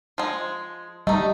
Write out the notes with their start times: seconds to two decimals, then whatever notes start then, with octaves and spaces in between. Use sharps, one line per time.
0.18 F3 G#3
1.07 G3 A3 D#4 D#5